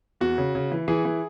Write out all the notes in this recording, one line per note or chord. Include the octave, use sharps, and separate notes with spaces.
E2 F#4
C#3
C#3
E3
E3 G#4
E3